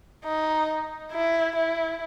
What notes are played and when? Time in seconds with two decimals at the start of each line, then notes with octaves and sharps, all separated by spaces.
0.25 D#4
1.12 E4
1.56 E4